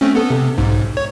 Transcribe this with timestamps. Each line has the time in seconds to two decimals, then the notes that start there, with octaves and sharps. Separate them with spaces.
0.01 A3 C4 C#4
0.15 B3 A4
0.30 C3
0.58 B1 G#2
0.97 C#5